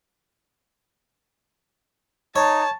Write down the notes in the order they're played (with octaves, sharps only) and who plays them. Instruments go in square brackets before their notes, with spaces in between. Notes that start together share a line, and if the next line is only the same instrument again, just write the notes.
[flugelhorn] D#4 [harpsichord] C#5 [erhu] A5